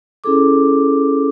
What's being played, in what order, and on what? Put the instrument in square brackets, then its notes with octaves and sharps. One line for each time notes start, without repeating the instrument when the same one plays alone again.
[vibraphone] C#4 E4 G#4 A4 D6